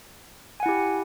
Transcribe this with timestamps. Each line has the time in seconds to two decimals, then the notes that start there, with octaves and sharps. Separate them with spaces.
0.60 G#5
0.63 F#5
0.66 E4
0.69 G4